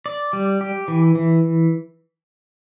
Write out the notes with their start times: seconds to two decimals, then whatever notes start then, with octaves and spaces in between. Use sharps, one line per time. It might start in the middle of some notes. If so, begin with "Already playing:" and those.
0.06 D5
0.33 G3
0.61 G4
0.88 E3
1.15 E3